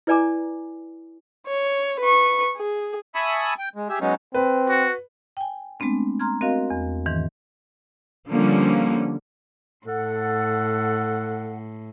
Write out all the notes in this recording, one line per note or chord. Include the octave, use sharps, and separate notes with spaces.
E4 B4 D5 G#5 A#5 D6
C#5
B4 C#6
G#4
E5 G#5 A5 B5 C#6 D#6
G5
G#3
G4 G#4 E5
F#3 G#3 B3 C#4 D#4
C4 B4
F#4
G5 G#5
G#3 A3 B3 C4 D4
A#5 C6 F6 G#6
C4 F#4 A#4 D#5 F5
E2
G#2 D#3 E3
D3 F3 G3 A#3 C#4
A2 A4 F#5